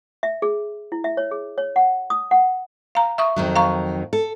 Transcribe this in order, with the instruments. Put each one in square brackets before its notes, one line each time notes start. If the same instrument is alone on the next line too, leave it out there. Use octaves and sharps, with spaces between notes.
[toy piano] E5
G#4
E4
E5
C#5
G#4
C#5
F#5
D#6
F#5
[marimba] F5 A#5
E5 C#6 D#6
[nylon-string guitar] F2 D#3 F#3
[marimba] F5 A#5 C#6
[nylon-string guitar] A4